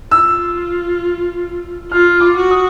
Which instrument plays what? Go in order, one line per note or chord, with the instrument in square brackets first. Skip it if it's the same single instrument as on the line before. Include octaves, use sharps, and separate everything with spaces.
[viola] F4 [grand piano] E6
[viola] F4 [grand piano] F6
[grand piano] D6
[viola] F#4
[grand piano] D#6